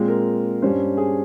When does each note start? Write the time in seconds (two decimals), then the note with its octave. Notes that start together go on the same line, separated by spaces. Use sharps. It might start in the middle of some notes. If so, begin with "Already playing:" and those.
Already playing: A#2 G#3 C4
0.08 A#4
0.62 G2 G3 C#4 C5
0.97 G#4